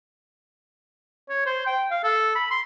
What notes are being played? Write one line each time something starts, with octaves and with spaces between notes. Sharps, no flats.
C#5
C5
G5
F5
A4
B5
C6